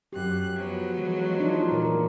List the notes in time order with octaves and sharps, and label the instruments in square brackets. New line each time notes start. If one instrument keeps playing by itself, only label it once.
[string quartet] F#2 F#6 [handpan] G4
[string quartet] F3 F#3 B3
[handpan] E3 G#3
D4 D#4 F4
A#2 E3 A#4